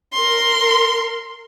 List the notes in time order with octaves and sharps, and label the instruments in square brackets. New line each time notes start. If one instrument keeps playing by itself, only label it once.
[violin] A#4 C6